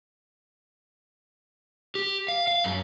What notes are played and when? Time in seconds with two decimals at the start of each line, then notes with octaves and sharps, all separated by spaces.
1.95 G4
2.28 F5
2.48 F5
2.64 F#2